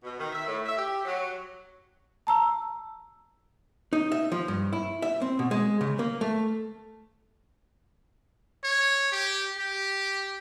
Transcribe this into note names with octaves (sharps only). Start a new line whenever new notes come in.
B2
D#3
E5
A2
E5
G4
F#3
A5 A#5 E6
D#4
E5
F3
G2
E4
E5
C4
B2
G#3
C#3
A#3
A3
C#5
G4
G4